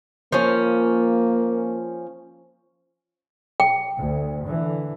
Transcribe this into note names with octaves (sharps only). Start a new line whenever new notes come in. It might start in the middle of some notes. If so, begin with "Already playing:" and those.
F3 A#3 C#4
G5
D2
D3 E3